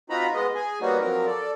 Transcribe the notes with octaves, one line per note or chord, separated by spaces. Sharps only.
C4 D#4 F4 F#4 A#5 B5
G#3 B3 D#5
G#4 G#5
G3 A#3 B3 C#4 D#4 F#4
F3 F#3 C4 A#4
A4 D5